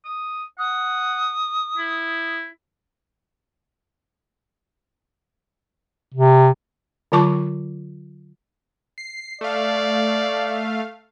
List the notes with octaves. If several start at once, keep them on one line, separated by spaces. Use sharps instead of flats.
D#6
F#5 D#6
E4
C3
D3 F#3 F4 A5 C#6 D6
C7
A3 D5 F5